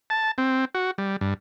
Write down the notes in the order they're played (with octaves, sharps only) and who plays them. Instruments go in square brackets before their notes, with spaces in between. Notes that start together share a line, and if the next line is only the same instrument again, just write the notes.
[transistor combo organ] A5
C4
F#4
G3
G2